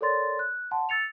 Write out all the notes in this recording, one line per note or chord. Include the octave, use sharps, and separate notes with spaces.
A4 A#4 C#5 D5 C6 A6
F#6
F#5 A5 C6
E6 A6 C#7 F7